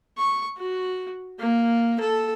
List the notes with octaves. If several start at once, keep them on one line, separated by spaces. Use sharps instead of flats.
C#6
F#4
A#3
A4